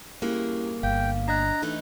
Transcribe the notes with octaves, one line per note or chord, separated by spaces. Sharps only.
G2 A#3 C#4 E4 G4 G#4
G1 F5 G5
D4 D#5 A#5 F#6
E3 A3 D#4